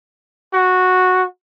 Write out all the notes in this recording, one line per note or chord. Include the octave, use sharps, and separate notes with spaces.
F#4